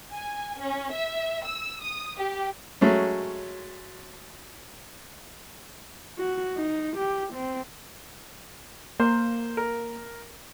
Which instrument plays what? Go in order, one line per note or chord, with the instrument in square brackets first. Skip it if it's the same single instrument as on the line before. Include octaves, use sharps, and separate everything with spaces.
[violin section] G#5
C#4
E5
E6
D#6
G4
[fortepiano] F#3 G#3 A3 C#4
[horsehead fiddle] F#4
D#4
G4
C4
[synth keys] A#3 [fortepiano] C5
[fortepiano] A#4